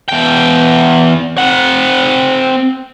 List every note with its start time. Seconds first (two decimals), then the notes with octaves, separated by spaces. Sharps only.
0.09 E2 G5
1.38 C4 F#5